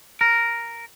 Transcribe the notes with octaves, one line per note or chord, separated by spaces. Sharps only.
A#4